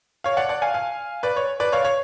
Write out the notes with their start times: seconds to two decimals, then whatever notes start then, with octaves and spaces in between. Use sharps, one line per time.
0.24 C#5 F5
0.37 D5 F#5
0.49 D5 F#5
0.62 F5 G#5
0.74 F5 G#5
1.23 B4 D5
1.36 C#5
1.60 B4 D5
1.72 C#5 F5
1.85 C#5